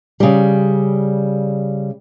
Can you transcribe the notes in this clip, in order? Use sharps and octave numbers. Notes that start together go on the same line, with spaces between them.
C#3 G3